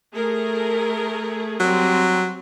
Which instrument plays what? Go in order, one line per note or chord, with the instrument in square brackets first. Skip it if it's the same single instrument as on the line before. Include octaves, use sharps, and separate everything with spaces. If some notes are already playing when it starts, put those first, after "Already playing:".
[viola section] A3 G#4 A#4
[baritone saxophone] F#3 [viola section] G3 C4